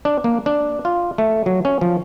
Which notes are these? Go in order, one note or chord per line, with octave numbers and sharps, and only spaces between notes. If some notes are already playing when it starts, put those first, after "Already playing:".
D4
A#3
D4
F4
A3
F#3
C#4
F3